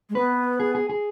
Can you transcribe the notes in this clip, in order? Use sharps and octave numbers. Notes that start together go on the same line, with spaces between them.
G#3
B3 B4
G#4
G#4
G#4